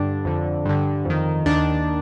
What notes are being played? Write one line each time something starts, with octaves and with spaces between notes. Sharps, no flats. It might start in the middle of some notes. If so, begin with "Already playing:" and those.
Already playing: G2 D3 D4
F2 D3
G2 D3
F2 D#3
D#2 D#3 D4